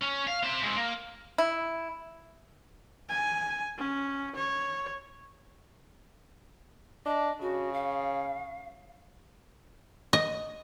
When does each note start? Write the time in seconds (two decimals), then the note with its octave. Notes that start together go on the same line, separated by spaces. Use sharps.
0.02 C#4
0.28 F5
0.44 C4 E5
0.63 G#3 C4
0.76 A#3
1.38 E4
3.09 G#5
3.78 C#4
4.36 C#5
7.06 D4 D#5
7.41 C#3 F#4
7.73 F5
10.13 D#5